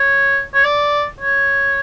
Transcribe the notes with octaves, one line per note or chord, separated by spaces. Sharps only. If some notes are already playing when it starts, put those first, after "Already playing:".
Already playing: C#5
C#5
D5
C#5